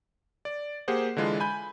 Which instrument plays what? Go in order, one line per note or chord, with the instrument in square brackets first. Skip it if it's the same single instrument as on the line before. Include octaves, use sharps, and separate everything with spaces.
[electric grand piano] D5
A#3 G4 G#4 C5 F#5
D3 E3 G#3 F4
G#5 B5 G6